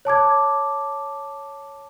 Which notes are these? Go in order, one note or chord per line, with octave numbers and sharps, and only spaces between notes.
C#5 A5 D6 G#6